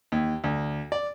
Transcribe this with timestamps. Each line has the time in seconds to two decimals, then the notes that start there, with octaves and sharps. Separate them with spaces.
0.12 D#2
0.44 D2
0.92 D5